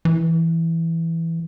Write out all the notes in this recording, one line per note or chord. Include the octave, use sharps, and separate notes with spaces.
E3